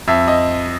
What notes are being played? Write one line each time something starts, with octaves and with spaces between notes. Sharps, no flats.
F2 E5
D#5